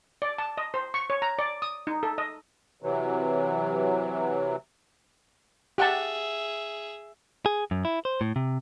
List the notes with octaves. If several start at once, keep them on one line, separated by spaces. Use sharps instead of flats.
D5
A5
D#5
C5
C#6
C#5
A#5
D5
D#6
D#4
A4
D#5
C3 E3 F#3
G4 G#4 E5 F#5 A5
G#4
F#2
E4
C5
A2
C3